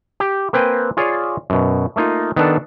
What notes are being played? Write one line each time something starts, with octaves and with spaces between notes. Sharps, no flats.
G4
A#3 C4 B4 G5 G#5
F4 G#4 C#5 D5 F5
F#2 B2
A3 A#3 D#4 F4
D#3 B3 D4 A4